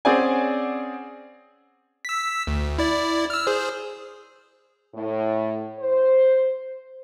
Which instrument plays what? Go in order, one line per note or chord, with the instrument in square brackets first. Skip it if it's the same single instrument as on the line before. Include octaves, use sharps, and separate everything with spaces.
[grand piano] C4 C#4 G#4 D5 F#5 G#5
[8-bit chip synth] E6 B6
D2
E4 D5
E6 F6
G#4 C5
[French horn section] A2
C5